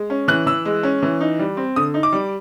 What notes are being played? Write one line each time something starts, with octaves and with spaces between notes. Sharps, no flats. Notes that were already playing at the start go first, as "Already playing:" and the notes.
Already playing: G#3
C#4
E3 F#6
E3 E6
G#3
C#4
E3
D#4
G3
C4
D3 D#6
D#4
D6
G3